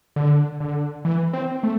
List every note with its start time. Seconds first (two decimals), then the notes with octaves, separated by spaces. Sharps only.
0.16 D3
0.60 D3
1.05 E3
1.33 C4
1.63 A3